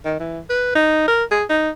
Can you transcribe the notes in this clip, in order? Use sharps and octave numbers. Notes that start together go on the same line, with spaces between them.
D#3
E3
B4
D#4
A#4
G#4
D#4